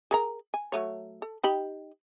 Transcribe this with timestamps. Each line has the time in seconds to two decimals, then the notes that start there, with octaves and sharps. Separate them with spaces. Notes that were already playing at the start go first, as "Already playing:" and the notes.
0.11 G#4 A#4 A#5
0.54 G#5
0.72 F#3 A3 C#5
1.22 A4
1.44 D#4 G4 B5